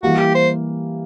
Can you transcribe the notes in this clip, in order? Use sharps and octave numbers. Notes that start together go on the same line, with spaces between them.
E3 G3 A#3 F#4
G4
C5